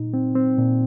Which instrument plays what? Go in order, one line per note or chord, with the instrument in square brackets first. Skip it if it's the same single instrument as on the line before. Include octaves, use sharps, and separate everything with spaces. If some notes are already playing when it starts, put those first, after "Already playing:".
Already playing: [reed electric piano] A#2 D#4
C4
C4
A#2